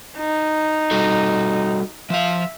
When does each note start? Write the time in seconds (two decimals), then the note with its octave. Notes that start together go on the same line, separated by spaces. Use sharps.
0.18 D#4
0.91 G3 F#4 A4
2.10 F3 E5 F5